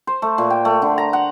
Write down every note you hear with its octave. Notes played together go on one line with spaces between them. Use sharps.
C5
A3
A#2
G5
A3
D3
A#5
F#5